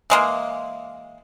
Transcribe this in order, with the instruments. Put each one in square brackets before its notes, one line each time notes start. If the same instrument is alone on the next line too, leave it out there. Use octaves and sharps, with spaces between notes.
[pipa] E3 G#3 A#3